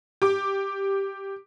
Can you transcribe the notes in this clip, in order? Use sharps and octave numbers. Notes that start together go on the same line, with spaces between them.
G4 D6